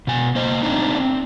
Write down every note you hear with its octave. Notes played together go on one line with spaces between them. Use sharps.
B2 G#5
A#3 C5 D#5
A3 C4 D4 D#4
C4